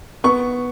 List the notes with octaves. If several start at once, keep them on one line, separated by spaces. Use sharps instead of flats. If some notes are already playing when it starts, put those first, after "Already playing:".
B3 C#6